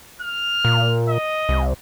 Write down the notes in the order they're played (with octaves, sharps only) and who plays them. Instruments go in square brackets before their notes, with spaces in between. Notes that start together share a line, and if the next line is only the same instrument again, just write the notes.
[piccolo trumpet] F6
[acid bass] A#2
[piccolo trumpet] D#5
[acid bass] C2